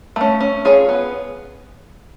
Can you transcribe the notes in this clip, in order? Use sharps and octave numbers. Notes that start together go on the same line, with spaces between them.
A3 C#4
C#4
F4 G#4 C#5
B3